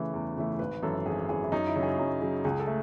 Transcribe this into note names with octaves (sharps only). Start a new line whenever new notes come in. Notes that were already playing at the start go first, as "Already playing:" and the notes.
Already playing: C#3 E3 A3 B4
E2
C#3 E3 A3
G#1 B4
F#2 E3 A4
G#1 G#4
F#2 E3 G#4
E4
F#2 D#4
E4
C#3 F#3
G#4
F#2
C#3 F#3
C#2 G#4
A4
A3